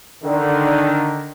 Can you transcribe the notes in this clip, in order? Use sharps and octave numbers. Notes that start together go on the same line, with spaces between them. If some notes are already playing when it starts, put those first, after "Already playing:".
D3 D#3